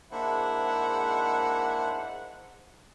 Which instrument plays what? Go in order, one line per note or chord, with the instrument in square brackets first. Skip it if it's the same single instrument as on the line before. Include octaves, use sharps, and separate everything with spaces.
[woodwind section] G#2 F#5 [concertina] A#3 D4 C5 [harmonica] E4